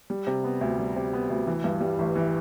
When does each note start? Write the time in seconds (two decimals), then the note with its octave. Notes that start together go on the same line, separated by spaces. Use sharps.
0.10 G3
0.27 C3
0.44 B3
0.61 D2
0.79 G3
0.96 C3
1.13 B3
1.30 D2
1.47 E3
1.64 G2
1.81 G3
1.99 A1
2.16 E3